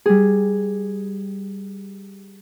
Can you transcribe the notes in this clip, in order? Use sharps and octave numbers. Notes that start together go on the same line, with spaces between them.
G3 G#4